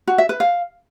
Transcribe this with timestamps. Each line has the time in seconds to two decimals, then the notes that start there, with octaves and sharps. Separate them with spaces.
0.07 F#4
0.18 E5
0.29 B4
0.40 F5